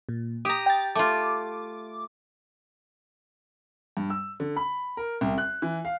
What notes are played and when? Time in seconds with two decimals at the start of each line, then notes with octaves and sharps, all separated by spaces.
0.09 A#2
0.45 G4 A#5 D#6
0.66 G5 A6
0.95 A3 F4 D6
3.97 G2
4.10 E6
4.40 D3
4.56 B5
4.97 A#4
5.21 C2
5.38 F#6
5.62 E3
5.85 F5